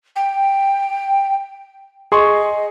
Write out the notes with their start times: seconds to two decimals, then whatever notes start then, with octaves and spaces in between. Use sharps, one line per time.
0.16 G5
2.12 G#4 D#5 C6 C#6